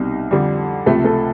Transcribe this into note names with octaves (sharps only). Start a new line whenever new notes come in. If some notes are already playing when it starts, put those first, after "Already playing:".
Already playing: C2 B2 G3 D#4
F2 D3 G3
C#2 C3 F3 A3 A4
A3 A4